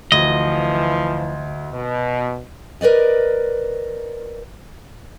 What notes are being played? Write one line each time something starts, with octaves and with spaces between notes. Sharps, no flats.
D2 E3 F3 D#5
B2
A#4 B4 D5 D#5